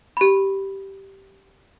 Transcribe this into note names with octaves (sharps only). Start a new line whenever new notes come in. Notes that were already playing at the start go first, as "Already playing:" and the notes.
G4 B5